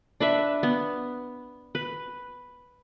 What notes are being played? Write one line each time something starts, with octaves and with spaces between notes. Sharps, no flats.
D4 B4 E5
B3
B4